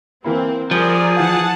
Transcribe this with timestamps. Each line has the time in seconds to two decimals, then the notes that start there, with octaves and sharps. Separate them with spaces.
0.24 E3 A#3 C4 E4
0.71 F3 G3 G#4 A#4 D5
1.16 E3 F5 F#5 A5